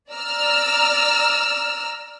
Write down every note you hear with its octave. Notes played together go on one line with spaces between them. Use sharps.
D5 A#5 E6 F6